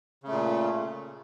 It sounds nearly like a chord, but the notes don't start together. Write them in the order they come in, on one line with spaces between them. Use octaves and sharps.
C#3 A3 A#2